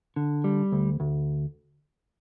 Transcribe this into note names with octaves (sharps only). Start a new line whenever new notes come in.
D3
G3
D2
D2